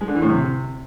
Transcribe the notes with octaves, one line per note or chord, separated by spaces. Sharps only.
G#3
D3
E3
A2
C3